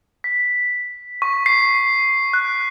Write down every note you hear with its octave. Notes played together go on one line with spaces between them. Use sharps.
B6
C#6
C7
F#6